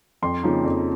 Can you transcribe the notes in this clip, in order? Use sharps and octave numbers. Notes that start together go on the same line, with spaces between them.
F2 C6
C#3 F3 A#3 D#4
F2